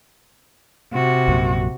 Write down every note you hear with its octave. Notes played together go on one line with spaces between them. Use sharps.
C3 F#4
A#1 F#2 A#2